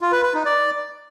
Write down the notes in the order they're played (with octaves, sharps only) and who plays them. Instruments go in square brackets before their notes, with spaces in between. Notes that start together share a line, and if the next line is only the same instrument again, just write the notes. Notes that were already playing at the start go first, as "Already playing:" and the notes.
[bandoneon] F4
B4
B4
D#4
D5